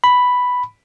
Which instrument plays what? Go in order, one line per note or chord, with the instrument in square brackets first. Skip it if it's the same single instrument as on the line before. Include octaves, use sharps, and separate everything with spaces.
[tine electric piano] B5